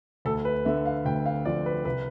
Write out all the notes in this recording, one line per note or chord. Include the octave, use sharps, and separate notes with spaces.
D2 A4
B4
D3 E5
F5
D2 G5
F5
F3 D5
B4
C2 B4